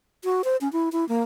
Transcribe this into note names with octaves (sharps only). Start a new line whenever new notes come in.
F#4
C5
C#4
E4
E4
A#3